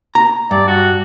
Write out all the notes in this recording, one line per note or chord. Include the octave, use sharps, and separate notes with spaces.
A#5
G2 D5
F#4